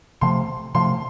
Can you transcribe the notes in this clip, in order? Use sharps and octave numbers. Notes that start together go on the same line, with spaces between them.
C3 F3 A3 C6
C3 F3 A3 C6